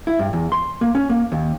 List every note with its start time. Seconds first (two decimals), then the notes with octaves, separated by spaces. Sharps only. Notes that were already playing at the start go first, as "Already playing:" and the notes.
0.07 E4
0.19 G2
0.33 E2
0.52 C6
0.81 A#3
0.95 C#4
1.10 A#3
1.32 D#2